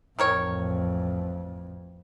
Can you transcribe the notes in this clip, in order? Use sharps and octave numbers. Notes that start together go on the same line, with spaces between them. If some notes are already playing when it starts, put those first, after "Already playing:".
A1 F2 D#3 A#4 C#5